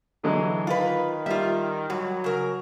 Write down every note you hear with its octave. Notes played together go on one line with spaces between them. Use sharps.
D3 E3 F#3 G#3
D#3 F4 B4
G3 F4 E5
F#3 G3 F#4
C#3 A#4